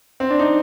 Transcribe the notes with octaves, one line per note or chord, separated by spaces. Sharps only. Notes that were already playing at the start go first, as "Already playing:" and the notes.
C4
D4
D#4